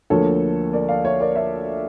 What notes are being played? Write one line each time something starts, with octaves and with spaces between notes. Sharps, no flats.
D2 D3 F3 A#3 A4 C#5
A#4 D5
D5 F5
C#5 E5
A#4 D5
C#5 E5